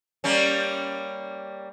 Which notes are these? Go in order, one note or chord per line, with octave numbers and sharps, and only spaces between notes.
G3 A#3 C#4